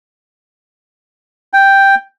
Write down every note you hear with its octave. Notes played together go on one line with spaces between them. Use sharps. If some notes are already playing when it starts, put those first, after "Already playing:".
G5